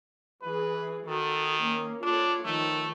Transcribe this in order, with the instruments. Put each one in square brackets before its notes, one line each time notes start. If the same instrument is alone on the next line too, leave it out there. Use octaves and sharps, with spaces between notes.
[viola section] E3 G#4 [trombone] B4
[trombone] D#3 [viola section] F#4 A4
[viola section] A#3 C#4
[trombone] D4 [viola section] F4 A4 C#5
[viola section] D#3 F3 [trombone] A3